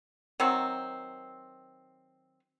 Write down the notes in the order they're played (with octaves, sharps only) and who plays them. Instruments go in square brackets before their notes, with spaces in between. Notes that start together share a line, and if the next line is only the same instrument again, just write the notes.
[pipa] D#3 F#3 C4